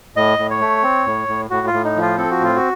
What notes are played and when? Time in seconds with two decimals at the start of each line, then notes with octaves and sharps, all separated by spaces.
0.16 A2 D#5
0.38 A2
0.50 C#5
0.61 A3
0.83 C4
1.06 A2
1.28 A2
1.50 A2 F#4
1.67 F4
1.73 A2
1.84 D#4
1.96 F3 F4
2.18 C4 A4
2.30 F#4
2.40 A2 F4
2.56 F#4